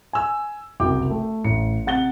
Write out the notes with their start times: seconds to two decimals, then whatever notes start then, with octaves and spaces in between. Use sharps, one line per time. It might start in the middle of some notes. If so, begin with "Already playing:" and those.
0.13 G#5 E6
0.80 F#1 C2 F#4 G5 D6
1.10 A3
1.44 A1 C#7
1.86 C3 F#5 A6 G7